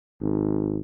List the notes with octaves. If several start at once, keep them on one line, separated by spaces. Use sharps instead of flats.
G#1